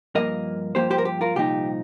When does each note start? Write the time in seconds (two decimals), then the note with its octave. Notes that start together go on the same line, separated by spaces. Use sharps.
0.15 G2 F3 A#3 A#4 D#5
0.75 G2 F3 A#3 G4 C5
0.91 G4 C5
0.98 A#4
1.05 G4
1.21 F4 A#4
1.36 C2 A#2 F3 D#4 G4